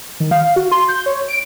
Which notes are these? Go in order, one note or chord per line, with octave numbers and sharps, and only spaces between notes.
D#3
F5
F#4
C6
G6
C#5
D7